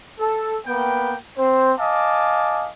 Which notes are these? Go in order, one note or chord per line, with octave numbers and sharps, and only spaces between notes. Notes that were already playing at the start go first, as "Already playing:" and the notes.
A4
A#3 B3 B4 G5
C4 C5
D#5 F5 G#5 A5 D6